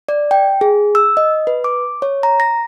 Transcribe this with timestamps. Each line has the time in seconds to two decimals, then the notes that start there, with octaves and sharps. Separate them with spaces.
0.09 D5
0.31 G5
0.61 G#4
0.95 E6
1.17 D#5
1.47 B4
1.64 D6
2.02 C#5
2.23 A#5
2.40 A#6